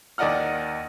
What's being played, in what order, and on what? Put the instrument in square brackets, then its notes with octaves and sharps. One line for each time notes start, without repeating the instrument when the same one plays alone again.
[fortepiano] D#2 D#3 D5 D#5 F#5 F6